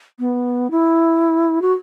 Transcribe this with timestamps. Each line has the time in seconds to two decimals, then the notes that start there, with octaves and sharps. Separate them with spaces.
0.19 B3
0.70 E4
1.61 F#4